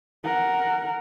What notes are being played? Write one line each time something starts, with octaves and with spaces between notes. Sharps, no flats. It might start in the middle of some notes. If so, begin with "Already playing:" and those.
A#4 F#5